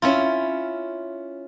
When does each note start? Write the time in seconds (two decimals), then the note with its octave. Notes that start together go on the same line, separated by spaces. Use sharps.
0.02 C#4 E4 F4